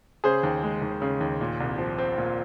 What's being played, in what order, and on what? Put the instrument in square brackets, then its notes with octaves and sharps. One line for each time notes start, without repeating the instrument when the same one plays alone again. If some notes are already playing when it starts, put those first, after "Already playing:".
[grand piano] C#3 G#4 C5
D#2
G#3
D#2
C#3
D#2
A#2
C2
F3
C4
A#2